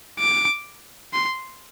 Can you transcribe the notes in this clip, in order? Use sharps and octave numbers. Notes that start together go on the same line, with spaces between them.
D6
C6